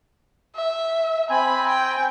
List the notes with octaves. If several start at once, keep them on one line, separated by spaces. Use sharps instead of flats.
E5
C4 G#5 B5
G5